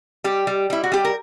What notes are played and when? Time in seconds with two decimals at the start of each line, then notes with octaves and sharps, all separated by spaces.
0.24 G3 G4
0.47 G3
0.70 G3 E4
0.84 F#4
0.92 G3 G4
1.05 A#4